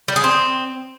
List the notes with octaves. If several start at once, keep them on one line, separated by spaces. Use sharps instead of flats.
G3
G#4
C4